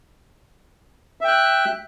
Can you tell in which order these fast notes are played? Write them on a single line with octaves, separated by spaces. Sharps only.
E5 G5 F#6